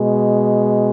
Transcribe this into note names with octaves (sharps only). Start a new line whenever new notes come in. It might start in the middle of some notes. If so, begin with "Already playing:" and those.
Already playing: B2 G#3